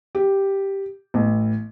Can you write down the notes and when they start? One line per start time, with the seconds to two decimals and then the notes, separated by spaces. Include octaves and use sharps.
0.15 G4
1.14 A1